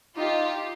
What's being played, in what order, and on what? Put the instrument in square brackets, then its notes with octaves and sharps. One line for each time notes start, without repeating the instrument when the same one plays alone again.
[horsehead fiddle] D#4 [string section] F4 G4